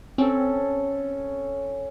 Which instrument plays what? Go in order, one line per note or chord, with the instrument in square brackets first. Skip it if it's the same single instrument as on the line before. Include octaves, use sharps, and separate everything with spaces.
[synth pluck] C4 [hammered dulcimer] C#4 A4